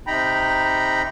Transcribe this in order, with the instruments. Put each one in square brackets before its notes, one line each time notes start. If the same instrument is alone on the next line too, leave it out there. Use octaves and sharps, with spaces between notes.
[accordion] C3 D#4 G5 A#5 B5